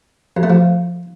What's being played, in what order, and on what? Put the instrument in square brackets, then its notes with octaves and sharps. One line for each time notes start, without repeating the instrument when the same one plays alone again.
[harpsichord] F2
A3
F3